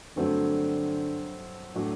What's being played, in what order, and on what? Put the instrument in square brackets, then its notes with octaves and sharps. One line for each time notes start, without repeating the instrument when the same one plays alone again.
[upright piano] G2 F#3 A3 C4 [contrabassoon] D3
[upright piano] A2 F#3 A3 D4